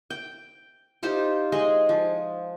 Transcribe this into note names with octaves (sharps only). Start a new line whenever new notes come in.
G5
D#4 F4 G4 C5
G#3 G#4 D#5
F3